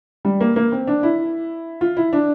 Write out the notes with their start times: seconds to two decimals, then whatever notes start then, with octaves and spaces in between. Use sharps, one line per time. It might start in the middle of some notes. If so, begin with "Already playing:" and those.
0.25 G3
0.41 A#3
0.56 A#3
0.72 C4
0.87 D4
1.03 E4
1.81 F4
1.97 E4
2.13 D4